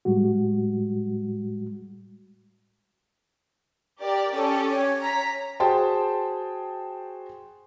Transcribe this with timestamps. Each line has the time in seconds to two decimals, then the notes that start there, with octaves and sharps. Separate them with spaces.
0.05 A2 G3 G#3 F#4
4.01 G4 A#4 D5
4.35 C#4 G4 A4
4.70 C#5
5.01 A#5 B6
5.60 F#4 G#4 C5 G5 A5 C6